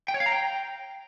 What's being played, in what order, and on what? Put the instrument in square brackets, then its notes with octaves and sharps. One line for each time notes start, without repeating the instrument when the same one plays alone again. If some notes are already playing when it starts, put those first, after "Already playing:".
[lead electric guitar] G5
C#5
F5
A#5
G5